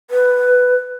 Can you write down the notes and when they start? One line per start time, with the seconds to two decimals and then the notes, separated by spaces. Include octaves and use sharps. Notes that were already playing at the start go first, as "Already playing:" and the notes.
0.10 B4